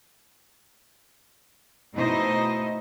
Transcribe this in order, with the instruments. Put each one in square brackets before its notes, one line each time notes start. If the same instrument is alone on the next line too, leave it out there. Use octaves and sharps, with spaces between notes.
[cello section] B2 A3 D#4 E4 C5 D#5